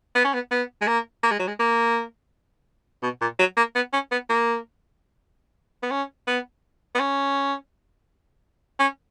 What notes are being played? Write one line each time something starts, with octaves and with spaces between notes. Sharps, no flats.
B3
C#4
B3
B3
G#3
A#3
A#3
G#3
F#3
G#3
A#3
B2
A#2
F#3
A#3
B3
C#4
B3
A#3
B3
C#4
B3
B3
C#4
C#4